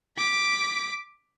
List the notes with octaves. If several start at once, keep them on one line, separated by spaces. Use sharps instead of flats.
D6 B6